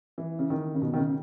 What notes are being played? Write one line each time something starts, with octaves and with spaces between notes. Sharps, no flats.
E3
C#3
D#3
C#3
B2
D#3
C#3